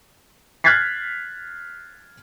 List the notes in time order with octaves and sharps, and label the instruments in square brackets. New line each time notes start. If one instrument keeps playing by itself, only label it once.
[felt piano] F6 F#6 G#6 A6 B6 C7